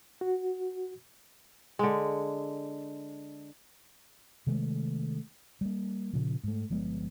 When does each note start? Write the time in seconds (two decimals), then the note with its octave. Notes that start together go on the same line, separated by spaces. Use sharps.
0.21 F#4
1.79 D3 G#3
4.47 C3 D#3 G#3 A3
5.61 G3 A#3
6.13 A#2 C#3 F3
6.44 G#2 A3
6.70 G1 F3 G#3 B3